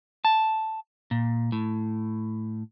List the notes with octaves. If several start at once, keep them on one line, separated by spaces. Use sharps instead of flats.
A5
A#2
A2